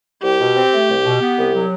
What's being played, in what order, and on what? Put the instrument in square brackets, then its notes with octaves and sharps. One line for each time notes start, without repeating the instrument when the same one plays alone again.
[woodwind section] C2 [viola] G4
[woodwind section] B2
C4
A3
C2
B2
B3
C2
F#3